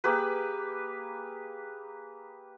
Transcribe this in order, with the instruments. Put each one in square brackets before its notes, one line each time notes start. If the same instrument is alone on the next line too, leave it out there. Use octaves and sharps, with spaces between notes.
[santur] A#3 G4 G#4 B4